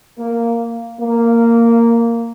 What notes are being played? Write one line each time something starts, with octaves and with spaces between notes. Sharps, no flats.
A#3
A#3